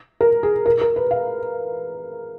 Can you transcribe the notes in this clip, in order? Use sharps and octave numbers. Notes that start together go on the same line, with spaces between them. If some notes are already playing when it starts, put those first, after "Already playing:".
A#4
G#4
A#4
A#4
B4
F5